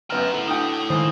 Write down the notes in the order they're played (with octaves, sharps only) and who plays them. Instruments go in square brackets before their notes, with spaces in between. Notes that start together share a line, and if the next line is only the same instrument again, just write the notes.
[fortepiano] F#2 B3 F6 [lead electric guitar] G5 A#5
[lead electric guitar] E4 A4
[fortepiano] D3 F#4 G5 [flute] D#6
[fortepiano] C#2 C5 [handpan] D#3 F3